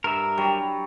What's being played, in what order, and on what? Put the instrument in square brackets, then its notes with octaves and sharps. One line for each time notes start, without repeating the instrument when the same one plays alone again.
[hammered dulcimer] G2 [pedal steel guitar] A#4 E5
[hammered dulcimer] F#3 G3